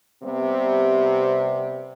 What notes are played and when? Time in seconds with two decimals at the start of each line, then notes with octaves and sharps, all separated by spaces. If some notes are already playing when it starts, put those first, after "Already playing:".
0.23 C3 G3 B3